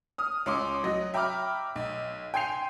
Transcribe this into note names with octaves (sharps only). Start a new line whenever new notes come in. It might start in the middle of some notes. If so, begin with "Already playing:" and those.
D#6 F6
C#2 C#4 C6 D6
F#3 D#5 A#6
E5 G5 A#5 B5 D6 F6
B1
G5 G#5 C6 G6 C7 F7